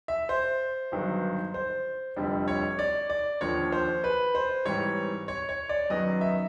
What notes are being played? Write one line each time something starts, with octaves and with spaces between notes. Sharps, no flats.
E5
C5
G1 G2 D#3 F#3
C5
F1 F2 D3 G3
C#5
D5
D5
D#2 D3 F3 A#3 C#5
C5
B4
C5
G#2 E3 G3 C4 C#5
C#5
C#5
D5
F#2 D#3 F#3 B3 D#5
E5